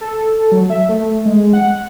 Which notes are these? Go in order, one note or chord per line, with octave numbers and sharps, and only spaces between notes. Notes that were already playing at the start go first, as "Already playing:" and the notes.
A4
F#3
E5
A3
G#3
F#5